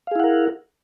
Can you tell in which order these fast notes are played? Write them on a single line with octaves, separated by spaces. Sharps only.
F5 G#4 E4 F#5 A#4